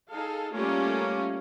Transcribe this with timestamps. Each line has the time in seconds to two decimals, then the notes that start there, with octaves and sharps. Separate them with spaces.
0.10 D#4 G#4 A4 F5
0.52 G3 A3 A#3 C#4 F4